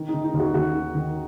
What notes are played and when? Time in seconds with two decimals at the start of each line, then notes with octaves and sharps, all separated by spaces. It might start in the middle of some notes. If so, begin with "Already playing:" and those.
Already playing: D#3
0.08 D#4
0.14 D#3
0.24 D#4
0.34 D#2
0.39 F#4
0.54 D#2 F#4
0.74 D#3
0.95 D#3